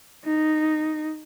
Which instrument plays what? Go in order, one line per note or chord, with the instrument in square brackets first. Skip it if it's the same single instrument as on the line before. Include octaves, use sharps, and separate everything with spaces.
[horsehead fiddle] D#4